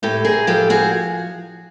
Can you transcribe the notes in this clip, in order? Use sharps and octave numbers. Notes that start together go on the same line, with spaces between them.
A2 G4 A4
G#4 A#4
F3 G4 A4
F#4 G#4